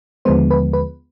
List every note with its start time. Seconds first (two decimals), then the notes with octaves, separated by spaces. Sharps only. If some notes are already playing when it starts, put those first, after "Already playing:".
0.25 D#2 D3 F3 G#3 B3 C5
0.50 B4
0.73 B4